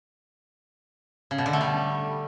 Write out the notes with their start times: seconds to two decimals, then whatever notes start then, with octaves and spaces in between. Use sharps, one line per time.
1.31 C#3
1.38 B2
1.46 D3
1.53 A3
1.61 G3